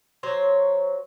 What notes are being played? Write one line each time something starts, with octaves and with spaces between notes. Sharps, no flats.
F#3 C5 C#5